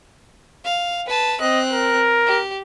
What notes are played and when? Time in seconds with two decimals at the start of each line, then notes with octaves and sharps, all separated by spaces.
0.64 F5
1.07 B4 A5
1.40 C4 D#5 F#6
1.71 A#4
2.26 G4